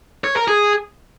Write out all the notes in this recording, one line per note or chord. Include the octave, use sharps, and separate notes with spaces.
C#5
A#4
G#4